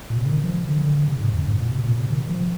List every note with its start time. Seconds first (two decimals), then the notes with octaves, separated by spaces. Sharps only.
0.10 A#2
0.17 C3
0.26 D3
0.31 D#3
0.44 F3
0.69 D3
0.82 D3
0.95 D3
1.08 C3
1.20 G#2
1.33 F2
1.46 G#2
1.59 A#2
1.71 C3
1.85 A#2
1.97 C3
2.10 D#3
2.29 F3